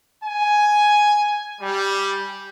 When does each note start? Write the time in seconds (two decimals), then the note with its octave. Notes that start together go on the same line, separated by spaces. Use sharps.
0.23 G#5
1.61 G3